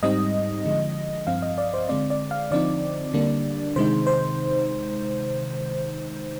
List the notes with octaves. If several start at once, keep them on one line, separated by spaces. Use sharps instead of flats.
G#2 G3 C4 D#4 D#5
D3 F3 G#3
G2 F3 C4 F5
D#5
D5
C5
D3 G#3 C4 D5
D5
F5
D3 F3 C4 D#4 D5
D3 G3 A#3 D4
C3 D#3 G#3 D#4 C5
C5